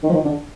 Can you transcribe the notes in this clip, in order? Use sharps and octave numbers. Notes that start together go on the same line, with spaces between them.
D#3
F3
D#3
D3